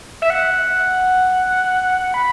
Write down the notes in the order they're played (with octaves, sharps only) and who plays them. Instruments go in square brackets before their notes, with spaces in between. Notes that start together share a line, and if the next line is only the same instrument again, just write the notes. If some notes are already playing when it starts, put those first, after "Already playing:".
[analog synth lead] E5
F#5
B5